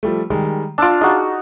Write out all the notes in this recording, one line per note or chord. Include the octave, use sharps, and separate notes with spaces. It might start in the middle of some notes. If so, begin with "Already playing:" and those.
F3 G3 A3
D#3 G3 G#3
D4 F4 E6 A6 D7
D#4 F#4 G#4